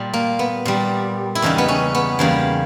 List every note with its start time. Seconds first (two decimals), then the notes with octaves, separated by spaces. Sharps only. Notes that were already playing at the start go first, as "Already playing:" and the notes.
Already playing: A#2 G3
0.14 A#3
0.39 B3
0.65 A#2 G3
1.35 E4
1.42 E2 C#3 G3 D#4
1.58 B3
1.68 C#4
1.95 B3
2.19 E2 C#3 G3 A#3